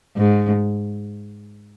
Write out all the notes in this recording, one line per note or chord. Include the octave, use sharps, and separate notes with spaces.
G#2